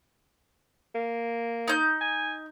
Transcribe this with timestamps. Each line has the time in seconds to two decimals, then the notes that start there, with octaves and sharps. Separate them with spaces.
0.95 A#3
1.68 D#4 G6
2.01 G#5